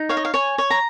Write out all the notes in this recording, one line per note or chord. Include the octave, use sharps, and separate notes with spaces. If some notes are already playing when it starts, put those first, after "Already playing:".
Already playing: D#4
C#5 F5
D#5
F5
C#5 G#5
C#5
A#5